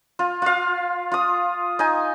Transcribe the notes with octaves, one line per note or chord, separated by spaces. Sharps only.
F4
F4 F5
F4 D#6
D#4 G#5